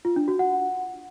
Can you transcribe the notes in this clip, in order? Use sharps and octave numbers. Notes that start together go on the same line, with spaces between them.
F4
D4
F#4
F#5